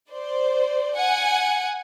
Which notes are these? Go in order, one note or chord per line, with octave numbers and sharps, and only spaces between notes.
C5 D5
F#5 G#5